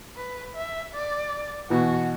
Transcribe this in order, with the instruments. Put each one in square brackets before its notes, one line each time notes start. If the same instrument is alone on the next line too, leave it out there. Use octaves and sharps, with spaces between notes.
[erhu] B4
E5
D5
[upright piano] B2 E3 [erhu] F#4